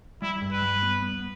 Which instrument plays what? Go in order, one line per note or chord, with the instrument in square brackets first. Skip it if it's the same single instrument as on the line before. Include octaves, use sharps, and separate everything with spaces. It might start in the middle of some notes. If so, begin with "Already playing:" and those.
[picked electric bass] G3 [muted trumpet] E4
[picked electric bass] G2
[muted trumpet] B4
[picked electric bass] G3
B3
B3